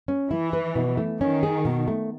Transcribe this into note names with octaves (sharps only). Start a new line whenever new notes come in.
C#4
E3 E4
B4
B2
A3
D#3 C#4
G#4
B2
A3